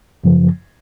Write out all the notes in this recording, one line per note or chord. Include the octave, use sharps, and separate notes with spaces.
F#2 C#3 F3